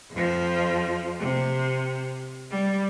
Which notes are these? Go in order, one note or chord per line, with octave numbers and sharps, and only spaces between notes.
F2 F3
C3
G3